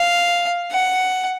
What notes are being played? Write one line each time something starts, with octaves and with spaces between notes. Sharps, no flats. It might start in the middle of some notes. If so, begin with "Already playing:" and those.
Already playing: F5
F#5